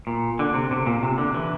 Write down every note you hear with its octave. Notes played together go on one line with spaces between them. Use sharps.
A#2
D3
C3
C3
A#2
C3
D3
E3